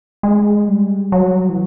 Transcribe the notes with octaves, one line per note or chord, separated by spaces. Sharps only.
G#3
G3
F#3
E3